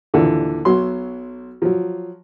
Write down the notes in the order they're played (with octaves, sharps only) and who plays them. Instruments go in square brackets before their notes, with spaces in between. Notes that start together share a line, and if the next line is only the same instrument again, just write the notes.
[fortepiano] D#2 A#2 D3 E3
B1 F#3 C6
F3 F#3